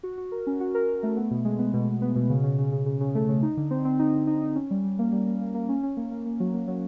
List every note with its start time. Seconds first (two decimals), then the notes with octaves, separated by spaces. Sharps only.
0.03 F#4
0.18 F#4
0.32 A#4
0.47 C#4
0.60 F#4
0.75 A#4
0.89 A#4
1.03 A3
1.17 B3
1.31 B2
1.45 G#3
1.59 B3
1.74 B2
1.88 B2
2.02 B3
2.16 B2
2.30 C#3
2.44 C#3
2.59 C#3
2.72 C#3
2.86 C#3
3.01 C#3
3.15 A3
3.29 C#3
3.43 D#4
3.57 D3
3.71 C4
3.85 C4
3.99 D#4
4.14 D3
4.27 D#4
4.42 D#4
4.55 C#4
4.71 G3
4.84 G3
4.99 A#3
5.12 G3
5.27 A#3
5.41 A#3
5.55 A#3
5.69 C#4
5.83 C#4
5.97 A#3
6.11 A#3
6.26 A#3
6.40 F#3
6.54 A#3
6.68 F#3